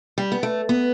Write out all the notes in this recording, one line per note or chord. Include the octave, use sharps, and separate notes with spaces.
G3
B3
A3
B3